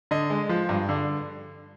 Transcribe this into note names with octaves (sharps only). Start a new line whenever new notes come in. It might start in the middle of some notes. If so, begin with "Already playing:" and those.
D3 D#5
G#3
F3
G2
D3